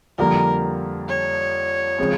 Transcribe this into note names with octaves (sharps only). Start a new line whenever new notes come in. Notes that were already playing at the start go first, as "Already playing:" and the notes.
F2 D3 G3 A#3 A#4
C#5
C#3 F3 G#3 C4